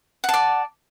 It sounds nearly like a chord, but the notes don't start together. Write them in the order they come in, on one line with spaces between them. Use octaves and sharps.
F#5 A5 D5